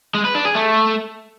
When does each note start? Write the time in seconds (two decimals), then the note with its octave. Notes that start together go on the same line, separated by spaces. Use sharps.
0.15 G#3
0.25 B4
0.35 D4
0.45 G#4
0.55 A3